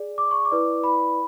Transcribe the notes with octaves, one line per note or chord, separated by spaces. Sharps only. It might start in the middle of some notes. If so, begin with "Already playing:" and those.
Already playing: G#4 D5
D6
C#6
D6
E4 B4 D5
B5